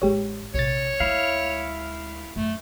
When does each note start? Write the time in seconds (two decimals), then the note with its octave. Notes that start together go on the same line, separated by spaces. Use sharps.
0.02 A1 G#3 G4 C#5
0.55 A#1 C3 C#5 A6
1.00 D2 G#3 E4 F5
2.36 F#2 A3